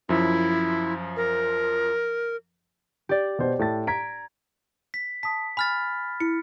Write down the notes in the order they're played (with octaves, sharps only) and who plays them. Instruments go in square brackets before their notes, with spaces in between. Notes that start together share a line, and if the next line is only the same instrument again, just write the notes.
[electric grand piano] F#2 F3 [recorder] E4
[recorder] A#4
[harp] G4 D5
[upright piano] B2 C5
A2 A5 A6
[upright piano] A#5 [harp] G#6 B6 D7
[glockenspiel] B6
[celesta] A5 D#6 [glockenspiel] B6
[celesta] G#5 [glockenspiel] B5 F6 A6
[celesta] E4 [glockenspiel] C#7